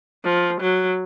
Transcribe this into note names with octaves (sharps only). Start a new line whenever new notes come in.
F3
F#3